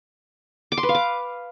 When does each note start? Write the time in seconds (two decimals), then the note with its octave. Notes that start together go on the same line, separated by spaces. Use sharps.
0.72 D6
0.77 C6
0.83 B4
0.89 F5
0.95 D6